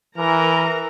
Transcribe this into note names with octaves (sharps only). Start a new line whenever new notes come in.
E3 A#4 A#5